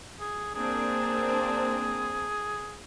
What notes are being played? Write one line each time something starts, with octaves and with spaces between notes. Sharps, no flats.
G#4
A#3 C4 D4 G#4